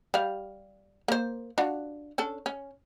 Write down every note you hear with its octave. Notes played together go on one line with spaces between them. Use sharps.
G3 F5
A#3 C5
D4 F4 F#4
C#4 D4 A4
C#4